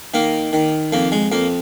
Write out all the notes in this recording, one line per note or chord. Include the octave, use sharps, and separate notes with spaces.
D#3 A#3
D#3
F2 A#3
G#3
F2 A#3